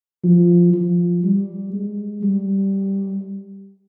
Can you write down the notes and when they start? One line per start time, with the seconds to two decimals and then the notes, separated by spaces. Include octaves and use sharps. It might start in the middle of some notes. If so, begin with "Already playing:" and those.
0.24 F3
0.74 F3
1.24 G3
1.73 G#3
2.23 G3